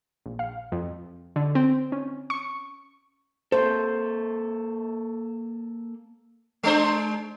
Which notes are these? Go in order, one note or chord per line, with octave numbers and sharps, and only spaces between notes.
A#1
F5
F2
D3
C4
C#4
C#6
A#3 A4 C5
G#3 D4 C5